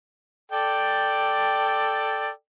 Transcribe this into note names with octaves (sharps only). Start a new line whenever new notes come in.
A4 D5 G5